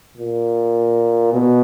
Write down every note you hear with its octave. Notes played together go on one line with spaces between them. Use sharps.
A#2
B2